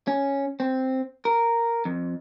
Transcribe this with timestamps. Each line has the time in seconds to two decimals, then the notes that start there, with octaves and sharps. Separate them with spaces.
0.07 C#4
0.60 C4
1.25 A#4
1.85 F2